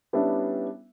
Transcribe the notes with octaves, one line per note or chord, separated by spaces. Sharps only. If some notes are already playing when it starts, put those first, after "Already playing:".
G3 B3 C#4 D4 E4 E5